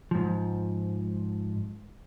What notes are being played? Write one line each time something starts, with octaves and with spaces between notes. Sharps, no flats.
G#2 F3